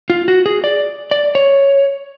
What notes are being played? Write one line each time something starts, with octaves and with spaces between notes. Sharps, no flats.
F4
F#4
G#4
D5
D5
C#5